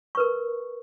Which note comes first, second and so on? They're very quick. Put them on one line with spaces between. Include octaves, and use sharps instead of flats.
C#6 B4 A#4